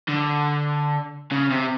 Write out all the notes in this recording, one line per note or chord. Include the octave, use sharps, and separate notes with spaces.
D3
C#3
C3